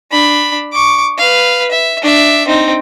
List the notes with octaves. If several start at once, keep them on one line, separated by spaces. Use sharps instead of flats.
D4 B5
C#6 D6
B4 F5
E5
D4 E5
C4 D#4